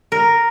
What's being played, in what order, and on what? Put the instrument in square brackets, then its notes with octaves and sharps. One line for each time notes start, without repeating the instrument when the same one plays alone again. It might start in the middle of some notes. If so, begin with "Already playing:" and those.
[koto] A#4